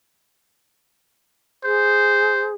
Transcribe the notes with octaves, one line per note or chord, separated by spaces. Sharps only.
G#4 C5